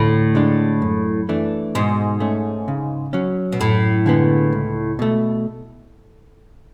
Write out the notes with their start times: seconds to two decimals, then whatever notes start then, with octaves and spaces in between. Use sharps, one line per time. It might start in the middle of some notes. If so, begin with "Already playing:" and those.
Already playing: D2 A2
0.35 D3 G#3 D4
0.82 F#2
1.29 E3 A3 D4
1.75 G#2 B2
2.20 A3 C#4
2.68 C#3
3.13 F#3 C#4
3.52 B2
3.59 F#2 A2
4.06 D3 G#3 B3
4.53 C#2
4.99 B2 A3